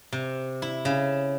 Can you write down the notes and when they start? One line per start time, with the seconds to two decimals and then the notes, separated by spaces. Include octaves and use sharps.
0.12 C3
0.62 E4
0.85 C#3